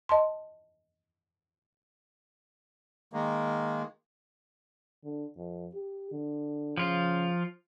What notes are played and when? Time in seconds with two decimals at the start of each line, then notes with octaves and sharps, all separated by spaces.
0.09 D#5 A5 C6
3.13 D#3 G#3 A#3
5.04 D3
5.36 F2
5.74 G4
6.12 D3
6.77 C#3 F3 F4